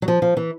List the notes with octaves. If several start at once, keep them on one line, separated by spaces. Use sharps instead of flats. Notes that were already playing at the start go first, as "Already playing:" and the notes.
F#3
F3
F3
E3